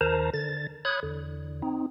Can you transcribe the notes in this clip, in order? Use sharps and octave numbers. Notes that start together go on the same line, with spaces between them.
D#2 D#3 A#4 C5 A5 A#5
D3 A6
C#5 B5 D#6 F#6 G#6
E2 D3
C4 D#4